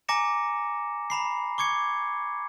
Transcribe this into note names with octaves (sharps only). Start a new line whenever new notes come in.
G#5 A#5 D6 A#6 C#7 E7
A#5 B5 C7
C#6 D6 G#6 C#7